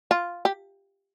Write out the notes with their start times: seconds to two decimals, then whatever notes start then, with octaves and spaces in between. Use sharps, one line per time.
0.11 F4
0.45 G4